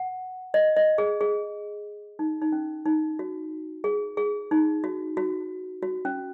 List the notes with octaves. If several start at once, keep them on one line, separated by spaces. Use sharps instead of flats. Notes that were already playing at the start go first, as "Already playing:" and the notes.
Already playing: F#5
D#5
D#5
G#4
G#4
D#4
D#4
C#4
D#4
F#4
G#4
G#4
D#4
F#4
F#4
F#4
C#4